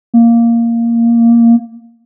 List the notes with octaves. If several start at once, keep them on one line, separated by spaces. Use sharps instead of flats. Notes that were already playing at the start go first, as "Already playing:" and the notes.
A#3